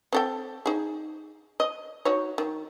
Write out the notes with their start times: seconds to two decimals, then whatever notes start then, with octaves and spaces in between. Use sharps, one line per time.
0.13 C4 A4 G5
0.66 D#4 G#4
1.60 D#5
2.05 D#4 F#4 C#5
2.38 D#3